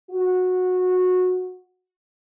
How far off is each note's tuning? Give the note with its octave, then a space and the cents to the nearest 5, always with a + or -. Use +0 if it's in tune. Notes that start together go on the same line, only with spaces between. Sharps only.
F#4 -15